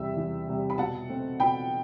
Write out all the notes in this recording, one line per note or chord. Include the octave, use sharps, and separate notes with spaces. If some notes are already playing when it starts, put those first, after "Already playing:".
Already playing: E2 C3 G3 E5
E2
C3 G3
B5
B2 F#5 A5
A3 C4
B2 G5 B5